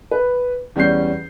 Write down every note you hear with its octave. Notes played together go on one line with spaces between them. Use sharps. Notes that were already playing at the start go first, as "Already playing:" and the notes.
B4
E2 G3 C#4 G6 C7